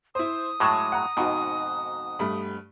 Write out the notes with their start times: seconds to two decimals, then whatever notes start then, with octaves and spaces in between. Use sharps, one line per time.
0.15 E4 C5 D#6
0.60 A2 F#3 G#3 A5 C#6 D6
0.92 F#5 A#5
1.17 F2 G#2 B2 D#4 F#4
2.19 G2 A3 B5